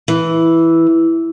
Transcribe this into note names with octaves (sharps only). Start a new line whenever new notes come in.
E3